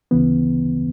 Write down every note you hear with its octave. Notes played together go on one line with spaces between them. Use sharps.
D2 C#3 E3 B3